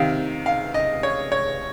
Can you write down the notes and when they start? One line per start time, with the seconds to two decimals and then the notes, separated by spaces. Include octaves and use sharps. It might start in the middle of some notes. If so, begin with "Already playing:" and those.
Already playing: C3 D#3 F5
0.46 F5
0.74 D#5
1.03 C#5
1.32 C#5